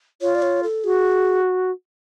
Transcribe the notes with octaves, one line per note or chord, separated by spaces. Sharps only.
F4 C#5
D5
C#5
A4
F#4 G#4